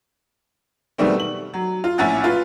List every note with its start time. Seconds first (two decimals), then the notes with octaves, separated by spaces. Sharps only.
0.98 B2 D#3 G3 A3 C4
1.20 F#7
1.54 F#3
1.84 F4
1.98 A#1 A2 C#4 E4 F#5 A6
2.24 F4 B4